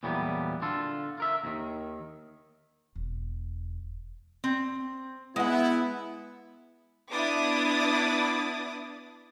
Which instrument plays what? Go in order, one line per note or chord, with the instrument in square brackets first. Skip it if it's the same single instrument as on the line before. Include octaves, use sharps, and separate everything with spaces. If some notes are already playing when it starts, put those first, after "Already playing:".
[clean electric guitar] E2 A#2 E3 F#3 G3 B3
D3 F4 A4
F4 A#4 E5
D#2 D#3
[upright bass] E1
[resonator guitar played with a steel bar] C4
[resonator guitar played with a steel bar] G#3 F#5 [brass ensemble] B3 E4
[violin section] B3 D4 E4 D6 D#6 A6